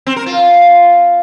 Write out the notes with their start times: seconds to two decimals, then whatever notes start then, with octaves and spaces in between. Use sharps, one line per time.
0.07 C4
0.16 A#4
0.26 F4